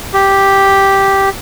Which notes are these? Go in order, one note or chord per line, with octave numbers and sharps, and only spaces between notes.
G4